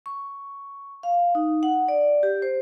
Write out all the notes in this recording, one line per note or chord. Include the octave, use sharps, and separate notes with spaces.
C#6
F5
D#4
F#5
D5
G4
C5